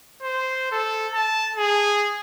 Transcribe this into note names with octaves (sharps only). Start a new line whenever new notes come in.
C5
A4
A5
G#4